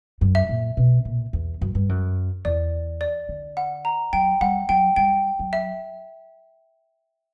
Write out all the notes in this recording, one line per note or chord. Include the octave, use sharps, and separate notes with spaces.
F#2
E5
A#2
B2
A#2
E2
F#2
G2
F#2
E2 D5
D5
D3
F#5
A#5
F#3 G5
G3 F#5
F#3 G5
G3 G5
F#3
E5